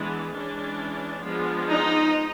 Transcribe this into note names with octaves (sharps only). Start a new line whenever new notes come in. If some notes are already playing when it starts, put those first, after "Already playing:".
Already playing: E3 G#3 B3 D4
E3 G#3 C#4 D4
F3 G#3 B3 D4
D#4